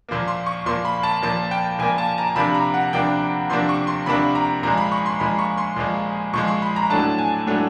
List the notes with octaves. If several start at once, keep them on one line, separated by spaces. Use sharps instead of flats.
A#2 F3 A#3
C6
C#6
A#2 F3 A#3 C6
B5
A5
A#2 F3 A#3 A5
G5
A#2 F3 A#3 G#5
A5
A#5
C3 F3 A#3 D4 B5
A#5
F#5
C3 F3 A#3 D4 G5
C3 F3 A#3 D4 C6
C#6
C6
C3 F3 A#3 D4 B5
A#5
A#2 F3 G#3 A#5
B5
C#6
C6
A#2 F3 G#3 B5
C#6
C6
A#2 F3 G#3
A#2 F3 G#3 C#6
C6
B5
A#5
A2 F#3 A3 D4 A5
G#5
A2 F#3 A3 D4